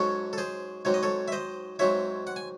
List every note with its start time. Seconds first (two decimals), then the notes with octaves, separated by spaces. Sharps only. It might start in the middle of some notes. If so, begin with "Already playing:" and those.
Already playing: G#2 F#3 C#4 A4 C#5
0.33 A4
0.38 G#4 C5
0.85 G#2 F#3 C4 C#5
0.94 D#5
1.03 A4 C#5
1.28 E5
1.32 C5 D#5
1.79 G#2 F#3 C4 C#5 E5
2.27 F#5
2.36 G#5